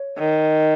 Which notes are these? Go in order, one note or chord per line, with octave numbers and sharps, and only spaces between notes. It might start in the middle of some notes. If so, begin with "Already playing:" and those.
Already playing: C#5
D#3